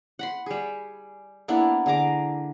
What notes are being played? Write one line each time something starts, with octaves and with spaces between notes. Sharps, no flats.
F#5 B5 C6
G3 G#4
A#3 B3 D4 E4
D3 G#4 A#5 D6